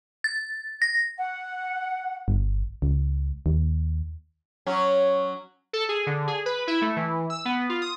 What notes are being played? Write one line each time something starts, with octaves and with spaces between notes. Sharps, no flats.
A6
A#6
F#5
G1
C#2
D#2
F#3 C#4
A4
G#4
D3
G#4
B4
E4
A3
E3
E6
B3
F4
D#6